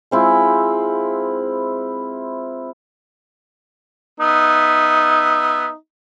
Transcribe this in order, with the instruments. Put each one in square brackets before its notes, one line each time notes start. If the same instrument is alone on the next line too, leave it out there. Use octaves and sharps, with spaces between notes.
[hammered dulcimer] G#3 C4 E4 F4
[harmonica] B3 E5 [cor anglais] D#4